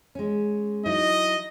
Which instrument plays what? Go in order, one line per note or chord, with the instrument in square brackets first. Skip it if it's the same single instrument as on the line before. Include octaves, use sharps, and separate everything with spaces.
[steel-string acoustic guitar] G#3 C#4
[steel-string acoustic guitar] F#3 D#4 E4 [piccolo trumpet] D#5